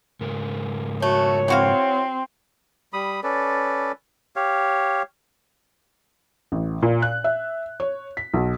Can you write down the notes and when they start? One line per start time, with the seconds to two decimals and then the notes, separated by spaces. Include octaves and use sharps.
0.21 G#2 C#3 A#4
1.02 A3 F#4 C#5
1.48 E3 C4 F#4 F5
2.93 G3 B5 D#6
3.23 C#4 A4 B4 D5
4.36 G4 C#5 F5
6.52 A1
6.82 A#2
7.02 F#6
7.24 E5
7.80 C#5
8.17 B6
8.34 B1